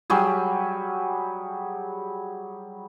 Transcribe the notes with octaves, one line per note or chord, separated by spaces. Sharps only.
F#3 G3 G#4